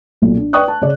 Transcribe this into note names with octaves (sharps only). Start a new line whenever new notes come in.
B1 A#2
D4
B4 D5 G5 C#6 D#6 F#6
A5
C#3 C#5 D5